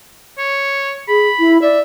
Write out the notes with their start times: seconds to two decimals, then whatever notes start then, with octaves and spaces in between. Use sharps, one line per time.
0.38 C#5
1.08 G#4 B5
1.39 E4
1.62 D5 E5